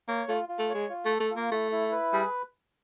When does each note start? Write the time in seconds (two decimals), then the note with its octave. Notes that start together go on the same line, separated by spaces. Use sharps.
0.08 A#3 C#5
0.28 A3 F4
0.49 F4
0.59 A3
0.69 C#5
0.74 G#3
0.89 F4
1.05 A3
1.11 A4
1.20 A3
1.30 F4
1.36 A#3
1.51 A3 E4
1.72 E4
1.92 B4
2.13 G3 G#4